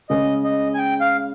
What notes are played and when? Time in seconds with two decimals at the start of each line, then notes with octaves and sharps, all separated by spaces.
0.10 C#3 G#3 C#4 D#5
0.44 D#5
0.74 G#5
0.78 G5
1.01 F5